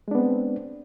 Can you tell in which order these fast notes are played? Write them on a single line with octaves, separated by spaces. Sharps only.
G#3 D4 B3 C4